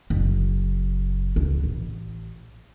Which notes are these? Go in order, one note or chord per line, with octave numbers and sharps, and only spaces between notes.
F#1
C#2
A1